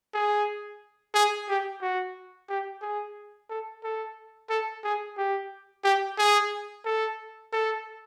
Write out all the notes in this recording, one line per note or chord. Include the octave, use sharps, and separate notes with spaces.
G#4
G#4
G4
F#4
G4
G#4
A4
A4
A4
G#4
G4
G4
G#4
A4
A4